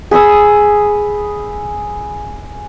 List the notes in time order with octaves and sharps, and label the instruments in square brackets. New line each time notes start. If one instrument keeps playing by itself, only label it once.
[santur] G#4 B5 D#6 E6